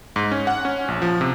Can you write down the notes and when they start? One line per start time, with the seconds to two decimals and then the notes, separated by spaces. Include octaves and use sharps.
0.16 G#2
0.32 C#4
0.47 F#5
0.65 C#4
0.88 A#1
1.02 F3
1.21 C3